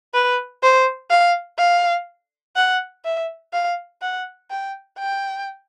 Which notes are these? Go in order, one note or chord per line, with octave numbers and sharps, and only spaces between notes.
B4
C5
F5
F5
F#5
E5
F5
F#5
G5
G5